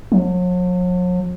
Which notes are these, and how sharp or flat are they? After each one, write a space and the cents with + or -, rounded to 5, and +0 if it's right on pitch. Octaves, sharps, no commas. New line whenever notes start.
F#3 -45